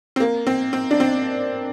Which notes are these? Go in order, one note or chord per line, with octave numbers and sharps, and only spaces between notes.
C4
A#3
C4
C4
D4
C4